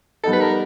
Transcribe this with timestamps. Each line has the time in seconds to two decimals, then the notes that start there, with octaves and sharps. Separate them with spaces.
0.23 G3 B3 D#4 A4
0.33 B4
0.40 A#4